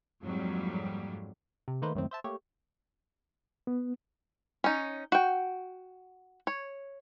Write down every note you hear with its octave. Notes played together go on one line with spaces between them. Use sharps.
F2 G#2 F#3 G3 A#3
C3
D#3 A3 A#3 D#4 B4 C5
C#2 F#2 A2 D#3 C4
C5 E5 A5
A3 A#3 G4 C#5
B3
C#4 D#4
F#4 G5
C#5